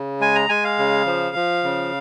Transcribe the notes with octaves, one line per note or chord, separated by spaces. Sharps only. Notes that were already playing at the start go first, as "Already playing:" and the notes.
Already playing: C#3
G#3 G#5
A#5
G#3 G#5
F5
C#3
F3
F3
C#3